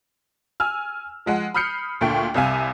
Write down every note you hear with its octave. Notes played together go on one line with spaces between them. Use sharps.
G#5 E6 F6
F3 G#3 F#5
B5 D#6 F6 G6 C7 C#7
D2 A#2 A3 G5 C#6
C2 C3 F5 G#5